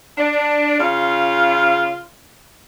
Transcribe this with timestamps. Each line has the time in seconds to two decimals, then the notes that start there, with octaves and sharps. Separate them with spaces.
0.18 D4
0.80 C#3 F4